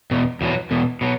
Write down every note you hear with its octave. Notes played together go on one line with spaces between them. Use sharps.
E2 B2
E2 B2 F#3
E2 B2
B2 F#3